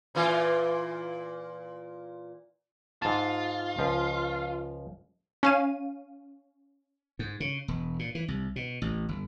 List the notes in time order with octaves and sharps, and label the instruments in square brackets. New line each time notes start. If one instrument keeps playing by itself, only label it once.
[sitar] A#2 E3 F4
[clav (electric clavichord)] G#2 A5 [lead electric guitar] F4
[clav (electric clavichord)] C#2 F3
[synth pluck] C#4 F5 D#7
[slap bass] G#2
C#3
E1
A#2
E3
C2
B2
A1
G1